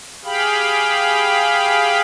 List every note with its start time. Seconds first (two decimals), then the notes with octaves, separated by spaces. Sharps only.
0.24 G4 G#4 F5 G5 B5